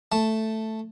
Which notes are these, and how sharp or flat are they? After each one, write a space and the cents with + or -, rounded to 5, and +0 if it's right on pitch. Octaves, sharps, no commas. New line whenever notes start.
A3 +0 A5 +0